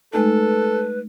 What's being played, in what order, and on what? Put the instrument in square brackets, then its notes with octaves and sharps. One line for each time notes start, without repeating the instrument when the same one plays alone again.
[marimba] G#3 A3 D#4 [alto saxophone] A4 [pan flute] B4